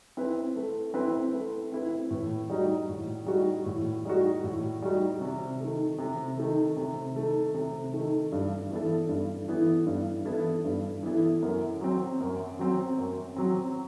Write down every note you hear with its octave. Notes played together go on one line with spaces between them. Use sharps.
C4 E4 B4
A3
C4 E4 B4
A3
C4 E4 B4
A2
G3 D#4 F#4
A2
G3 D#4 F#4
A2
G3 D#4 F#4
A2
G3 D#4 F#4
C3
D#3 A3
C3
D#3 A3
C3
D#3 A3
C3
D#3 A3
G2
E3 B3 E4 A4
G2
E3 B3 E4 A4
G2
E3 B3 E4 A4
G2
E3 B3 E4 A4
F#2
F#3 C4
F#2
F#3 C4
F#2
F#3 C4